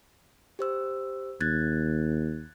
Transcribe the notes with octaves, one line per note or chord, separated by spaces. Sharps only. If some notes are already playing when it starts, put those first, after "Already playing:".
G4 C5 E6
D#2 F#6 G#6 A6